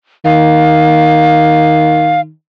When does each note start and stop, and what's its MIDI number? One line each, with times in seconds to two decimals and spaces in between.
0.25 2.32 51
0.25 2.21 77